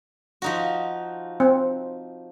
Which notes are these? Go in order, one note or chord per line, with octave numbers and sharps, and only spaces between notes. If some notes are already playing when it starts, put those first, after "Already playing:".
F3 D#4 F#4
C4